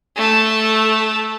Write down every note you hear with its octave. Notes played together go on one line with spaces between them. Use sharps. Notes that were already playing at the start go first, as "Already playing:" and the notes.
A3 A5